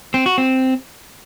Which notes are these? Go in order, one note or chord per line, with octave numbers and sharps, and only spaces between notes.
C4
F#4
C4